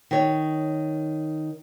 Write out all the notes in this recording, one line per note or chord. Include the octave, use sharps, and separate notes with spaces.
D#3 C#5